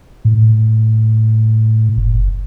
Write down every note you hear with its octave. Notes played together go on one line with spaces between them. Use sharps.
A2
F#1